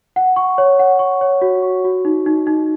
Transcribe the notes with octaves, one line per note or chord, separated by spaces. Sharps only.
F#5
C#6
C#5
F#5
C#6
C#5
F#4
C#6
F#4
D#4
D#4
D#4